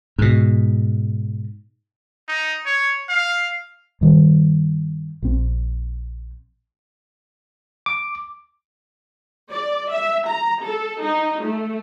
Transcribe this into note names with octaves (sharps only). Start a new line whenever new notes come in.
G#2 B2
D#4
C#5
F5
G2 D#3 G3
A#1 C4
D6
D5
E5
A#5
A4
D#4
A3